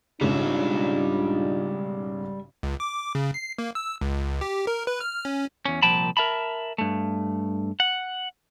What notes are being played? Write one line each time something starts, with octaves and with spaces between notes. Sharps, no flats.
B1 G#2 C#3 G3 D4 D#4 F4 E5
C#2
D6
C#3
C7
A#3
E6
C#2
G4
A#4
B4
F6
C#4
E2 C#4
C2 A#2 F3 G5 A5 B5
A#4 E5 A5 B5
G2 A3
F#5